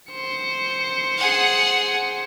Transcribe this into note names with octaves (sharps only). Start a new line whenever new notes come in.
C5 C#7
G#4 F#5